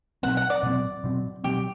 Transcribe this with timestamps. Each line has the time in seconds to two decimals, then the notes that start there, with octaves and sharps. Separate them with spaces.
0.23 B2 F#3 C4 F#5
0.37 F#5
0.50 D5
0.63 B2 F#3 C4
1.04 B2 F#3 C4
1.44 B2 F#3 C4 G4